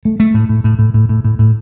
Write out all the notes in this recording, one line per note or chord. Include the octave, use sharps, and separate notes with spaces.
A3
A3
A2
A2
A2
A2
A2
A2
A2
A2